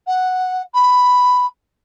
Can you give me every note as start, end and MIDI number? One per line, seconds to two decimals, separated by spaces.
0.07 0.62 78
0.74 1.46 83